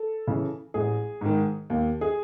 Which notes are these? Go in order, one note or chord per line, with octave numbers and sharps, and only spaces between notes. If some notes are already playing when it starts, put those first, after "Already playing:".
Already playing: A4
C#3 E3
A1 G#4
G#2 D#3
D#2
G#4